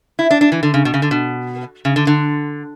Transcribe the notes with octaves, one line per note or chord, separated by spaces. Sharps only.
E4
D4
D4
E3
D3
C#3
B2
C#3
D3
B2
C#3
D3
D3